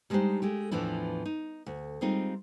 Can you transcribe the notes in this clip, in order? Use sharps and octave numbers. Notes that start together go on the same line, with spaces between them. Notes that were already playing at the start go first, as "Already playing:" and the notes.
G3 G#3 D4 D#4 G4 C5
G#3 A3 G4
E2 A2 E3 F3 D4 E4
D#4
D2
G3 G#3 C4 D#4 F4